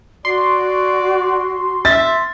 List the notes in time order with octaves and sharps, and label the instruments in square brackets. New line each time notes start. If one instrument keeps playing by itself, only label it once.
[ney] F#4 [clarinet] D5 [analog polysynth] C6
[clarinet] E5 [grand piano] A6